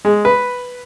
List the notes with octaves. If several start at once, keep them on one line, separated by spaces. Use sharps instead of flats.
G#3
B4